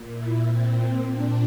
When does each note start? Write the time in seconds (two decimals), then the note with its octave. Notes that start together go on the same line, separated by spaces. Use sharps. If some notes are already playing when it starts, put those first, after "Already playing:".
Already playing: A#2
0.12 E4
0.42 A#2 C4
0.74 C4
1.06 A#2 D4